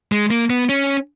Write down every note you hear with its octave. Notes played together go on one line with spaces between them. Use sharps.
G#3
A#3
B3
C#4